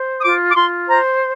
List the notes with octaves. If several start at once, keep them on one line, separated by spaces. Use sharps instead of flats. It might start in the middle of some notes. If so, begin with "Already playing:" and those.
Already playing: C5
D#6
F4 D6
D6
F4 C6
C5 A#5